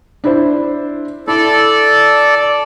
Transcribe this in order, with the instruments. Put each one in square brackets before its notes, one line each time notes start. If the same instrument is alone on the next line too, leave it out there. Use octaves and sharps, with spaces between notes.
[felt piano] D4 E4 C5
[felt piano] E4 [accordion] A4 D5